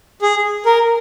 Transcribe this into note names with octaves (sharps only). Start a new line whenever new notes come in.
G#4
A#4